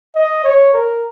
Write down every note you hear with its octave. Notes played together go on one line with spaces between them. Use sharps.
D#5
C#5
A#4